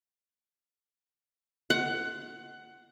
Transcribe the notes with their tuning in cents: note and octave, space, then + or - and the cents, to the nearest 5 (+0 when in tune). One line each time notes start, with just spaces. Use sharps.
F#5 +15